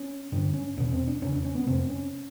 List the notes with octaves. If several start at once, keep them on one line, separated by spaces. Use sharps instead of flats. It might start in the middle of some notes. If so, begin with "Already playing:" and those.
Already playing: C#4
G2 D3 D4
C#4
E2 B2 C#4
C4
D4
E2 C#3 C#4
D4
C#4
B3
F2 C3 C4
C#4